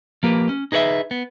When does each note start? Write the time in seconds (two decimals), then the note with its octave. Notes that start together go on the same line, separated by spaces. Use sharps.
0.23 F3 A#3 G4 B4
0.49 C#4
0.72 D#4 G#4 B4 C#5 E5
1.11 B3